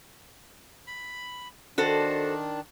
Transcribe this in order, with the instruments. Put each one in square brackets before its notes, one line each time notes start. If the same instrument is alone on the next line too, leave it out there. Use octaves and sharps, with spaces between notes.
[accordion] B5
[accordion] D#3 D4 [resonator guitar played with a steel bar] F#4 A4 C5